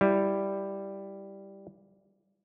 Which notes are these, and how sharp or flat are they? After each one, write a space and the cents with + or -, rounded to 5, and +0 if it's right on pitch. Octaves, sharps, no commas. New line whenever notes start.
G3 +0 E4 +0